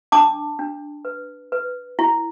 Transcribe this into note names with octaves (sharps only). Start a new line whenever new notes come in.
D4 A5 D6
D4
B4
B4
E4